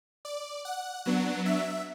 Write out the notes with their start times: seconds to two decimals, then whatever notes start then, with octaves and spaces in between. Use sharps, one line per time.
0.25 D5
0.65 F#5
1.05 F#3 B3 D4 F#5
1.46 E5